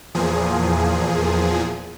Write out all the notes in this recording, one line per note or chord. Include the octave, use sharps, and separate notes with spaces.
E2 A#2 F3 G#4